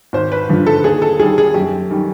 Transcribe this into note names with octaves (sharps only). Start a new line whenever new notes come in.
G#1 C5
B4
G2 D3 F3
A4
D#2 G#4
A4
D#3 G3 G#4
G#4
F#2 G4
D#3 G3